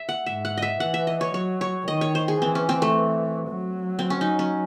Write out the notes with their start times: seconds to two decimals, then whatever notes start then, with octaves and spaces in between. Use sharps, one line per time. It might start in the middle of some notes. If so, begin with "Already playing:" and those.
Already playing: E5
0.09 F#5
0.26 G#2 E5
0.45 F#5
0.57 D#5 E5
0.80 E3 F#5
0.94 E5
1.07 D#5
1.21 C#5
1.33 F#3 C#5
1.61 C#5
1.88 D#3 D#5
2.01 C#5
2.15 C5
2.28 G#4
2.42 E3 C4
2.55 C#4
2.69 C4
2.82 A3
3.49 F#3
3.99 C4
4.10 C#4
4.21 D#4
4.39 C#4